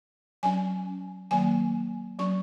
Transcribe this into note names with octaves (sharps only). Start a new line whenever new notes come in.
F#3 C#4 G#5
D#3 F#3 A#3 G#5
F#3 C#4 C#6